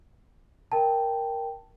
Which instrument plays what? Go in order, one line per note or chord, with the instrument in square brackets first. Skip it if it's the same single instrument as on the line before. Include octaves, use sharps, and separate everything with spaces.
[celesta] A#4 G5 A5